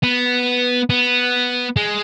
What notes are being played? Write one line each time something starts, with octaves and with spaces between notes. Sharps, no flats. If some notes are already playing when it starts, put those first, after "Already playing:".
B3
B3
G#3